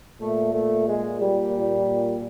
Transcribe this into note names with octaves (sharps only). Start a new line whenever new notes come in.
A#2 A3
A3
G#3
G3